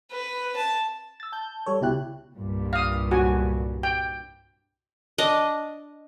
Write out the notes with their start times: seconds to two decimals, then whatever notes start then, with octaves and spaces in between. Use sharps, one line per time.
0.12 B4
0.56 A5
1.20 E6 A6
1.32 A5 G6
1.66 G3 A4 C#5
1.81 C#2 B2 E4 G4 F#6
2.37 C2 G2 A#2
2.73 F5 D#6
3.11 F#4 G#5
3.83 G5
5.18 D4 D#5